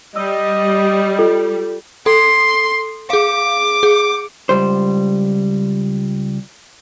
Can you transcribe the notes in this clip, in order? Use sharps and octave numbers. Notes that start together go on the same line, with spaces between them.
G3 D#5 E6
F4 A4
A4 C6
G#4 F5 D6
G#4
C#2 G3 C5